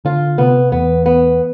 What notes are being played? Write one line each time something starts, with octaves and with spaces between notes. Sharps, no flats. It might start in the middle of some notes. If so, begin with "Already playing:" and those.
D3 F4
C3 B3
E2 B3
B3